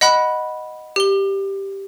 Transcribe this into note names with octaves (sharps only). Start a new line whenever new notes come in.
D#5 F#5 B5 F#6
G4 G7